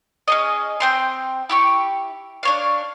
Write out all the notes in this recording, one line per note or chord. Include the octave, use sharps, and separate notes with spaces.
C#4 G#4 D#5
C4 G5 C6
E4 G4 C#6
D4 C#5 F5